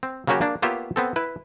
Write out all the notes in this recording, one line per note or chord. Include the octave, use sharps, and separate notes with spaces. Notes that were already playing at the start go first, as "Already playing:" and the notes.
C4
C#3 F#3 A#3 C#4 F#4 G4
A#3 D4
A#3 B3 F4 G4 C#5 E5
B3 C4 A4
E4 B4